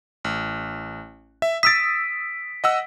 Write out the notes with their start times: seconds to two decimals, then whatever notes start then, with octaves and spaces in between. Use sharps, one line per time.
0.24 A1
1.42 E5
1.63 D#6 E6 A6 B6 D7
2.64 D#5 F#5 E6